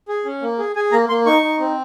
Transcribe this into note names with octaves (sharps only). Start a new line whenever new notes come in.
G#4
C#4
A#3
G#4
G#4 G#5
A#3 A#5
A#3 C6
D#4 C#6
D#4
C4